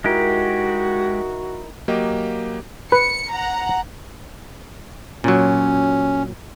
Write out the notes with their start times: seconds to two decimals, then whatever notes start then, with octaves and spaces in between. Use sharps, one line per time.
0.04 G#3 D#4 E4 F#4 G4 A#4
1.88 F#3 A#3 G4 D#5
2.92 B4 C#7
3.32 F#5 A#5
5.24 A#2 F#3 C#4